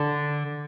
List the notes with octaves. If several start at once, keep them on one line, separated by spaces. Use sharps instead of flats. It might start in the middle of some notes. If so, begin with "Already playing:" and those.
Already playing: D3 D4